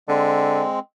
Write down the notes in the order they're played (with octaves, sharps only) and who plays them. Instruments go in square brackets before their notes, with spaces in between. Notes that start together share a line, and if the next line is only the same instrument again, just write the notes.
[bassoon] D3 [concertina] G#3 C4